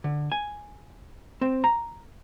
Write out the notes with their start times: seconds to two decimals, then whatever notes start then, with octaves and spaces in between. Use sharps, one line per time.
0.04 D3
0.32 G#5
1.41 C4
1.64 A#5